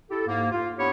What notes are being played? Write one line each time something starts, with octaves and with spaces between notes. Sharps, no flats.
E4 G4 A4
G#2 A#3
F4
B3 D4 E4 G4 C#5